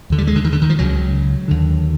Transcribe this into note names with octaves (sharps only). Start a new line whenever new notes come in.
D#2 D3
G3
G#3
D3
D#3
D3
D#3
F3
C#2 C#3 F#3
D#2 D3